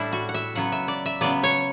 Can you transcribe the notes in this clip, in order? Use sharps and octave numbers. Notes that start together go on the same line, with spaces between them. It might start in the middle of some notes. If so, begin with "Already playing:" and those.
Already playing: A2 G3 D4 E4
F#4
F#5
E5
C#3 F#3 B3 F#5
E5
D5
E5
C#3 F#3 B3 D5
C#5